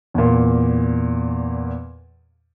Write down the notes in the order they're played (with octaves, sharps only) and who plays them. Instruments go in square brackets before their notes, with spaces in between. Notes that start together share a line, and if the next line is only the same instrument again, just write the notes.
[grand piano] E2 A#2